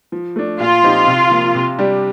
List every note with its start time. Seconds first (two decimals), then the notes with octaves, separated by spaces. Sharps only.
0.12 F3
0.36 A3 D4
0.60 A#2 F4
0.83 F3 C4 D#4 G4
1.07 C3
1.31 F3 A#3
1.55 C3
1.78 G3 D4 G4